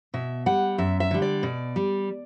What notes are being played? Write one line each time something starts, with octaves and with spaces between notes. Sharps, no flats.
B2 E5
G3 F#5
F#2 E5
E5
D3 G3
D5
B2
G3